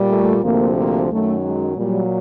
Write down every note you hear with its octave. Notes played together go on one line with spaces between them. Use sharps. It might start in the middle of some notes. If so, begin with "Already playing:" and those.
Already playing: A#2 G3
A3
D2 C3 F3 A#3
A#3
F#2 D#3 F#3 A3
G#3
A#2 F#3 G3